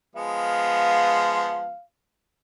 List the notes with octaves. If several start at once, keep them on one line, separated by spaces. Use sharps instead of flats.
F3 G#3 B3 F5